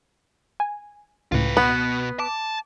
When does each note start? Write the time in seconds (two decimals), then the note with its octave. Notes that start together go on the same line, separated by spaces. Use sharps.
0.60 G#5
1.32 C#2 A2 F4 B4
1.57 B2 B3
2.19 A5 D6